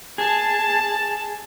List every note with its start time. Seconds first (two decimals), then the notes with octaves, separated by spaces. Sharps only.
0.18 G#4 A5